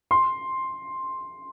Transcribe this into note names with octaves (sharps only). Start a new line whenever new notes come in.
C6